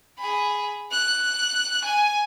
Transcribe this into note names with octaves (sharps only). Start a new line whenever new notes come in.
G#4 B5
F#6
G#5